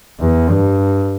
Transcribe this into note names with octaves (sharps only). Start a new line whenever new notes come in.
E2
G2